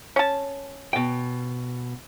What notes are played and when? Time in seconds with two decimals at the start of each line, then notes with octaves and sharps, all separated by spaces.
0.16 C#4 A5
0.93 B2 G5